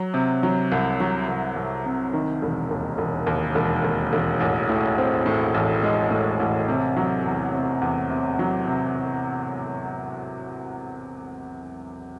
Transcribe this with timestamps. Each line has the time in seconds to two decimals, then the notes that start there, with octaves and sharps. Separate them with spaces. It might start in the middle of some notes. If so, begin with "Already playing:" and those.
Already playing: F#3
0.14 C3
0.43 F#3
0.72 C2
1.00 F#3
1.28 C2
1.56 C2
1.86 C3
2.13 D#3
2.42 E1
2.71 D#2
2.98 E1
3.26 D#2
3.55 E1
3.84 D#2
4.13 E1
4.40 A1
4.69 A2
4.98 C4
5.26 A2
5.54 A1
5.83 G#3
6.11 A2
6.40 A1
6.68 C3
6.97 F#3
7.25 E2
7.54 C3
7.81 E2
8.10 C3
8.39 F#3
8.67 C3